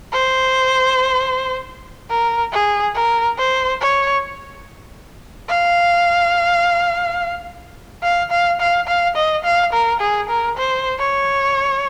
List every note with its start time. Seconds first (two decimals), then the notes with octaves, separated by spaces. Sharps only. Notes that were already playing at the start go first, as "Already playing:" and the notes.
0.13 C5
2.10 A#4
2.52 G#4
2.95 A#4
3.38 C5
3.80 C#5
5.49 F5
8.03 F5
8.31 F5
8.60 F5
8.87 F5
9.16 D#5
9.44 F5
9.73 A#4
10.00 G#4
10.29 A#4
10.57 C5
10.99 C#5